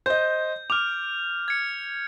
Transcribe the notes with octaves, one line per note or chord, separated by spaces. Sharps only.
C5 D#5 G6
D6 F6 F7
G#6 C#7